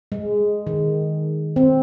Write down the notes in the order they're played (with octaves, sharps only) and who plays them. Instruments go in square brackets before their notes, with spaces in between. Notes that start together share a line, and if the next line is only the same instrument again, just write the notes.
[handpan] G#3
D#3
C4